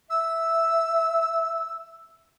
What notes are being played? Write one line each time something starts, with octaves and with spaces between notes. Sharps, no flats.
E5 E6